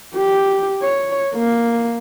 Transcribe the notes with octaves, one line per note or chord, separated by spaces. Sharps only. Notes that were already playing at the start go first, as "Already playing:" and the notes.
G4
C#5
A#3